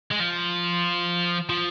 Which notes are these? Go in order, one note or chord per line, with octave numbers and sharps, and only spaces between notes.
G#3
F3
F3